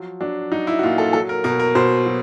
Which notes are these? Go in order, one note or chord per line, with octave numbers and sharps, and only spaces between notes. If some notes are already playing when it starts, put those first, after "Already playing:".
Already playing: F3 F#3
F#3 D4
F#3 D#4
E4
F#4
A#2 F4
A4
F#3 A4
A#4
B2 A#4
A#4
B2 C5
F#3